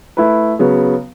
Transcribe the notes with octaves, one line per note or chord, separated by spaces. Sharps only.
A3 E4 B4
C#3 F#3 B3